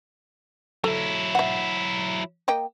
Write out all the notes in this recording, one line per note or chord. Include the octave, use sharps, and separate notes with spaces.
F#3 E4 A4
E5 F#5
A#3 D#5 G5